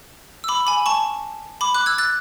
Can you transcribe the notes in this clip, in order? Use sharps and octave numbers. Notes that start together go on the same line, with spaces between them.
E6
B5 D6
G#5 B5
A5 C#6
B5 D6
D6 F#6
E6 G#6
F#6 A6